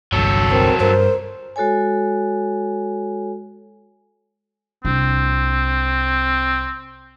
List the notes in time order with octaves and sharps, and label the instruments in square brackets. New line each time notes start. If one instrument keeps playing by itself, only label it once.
[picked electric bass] G1 C2 G2 [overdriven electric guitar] F#3 A4
[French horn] C4 [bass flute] A#4
[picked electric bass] G2 [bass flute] A#4 [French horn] C5
[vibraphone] G#3 F#4 A4 C#5 G#5
[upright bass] C2 D4 [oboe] C4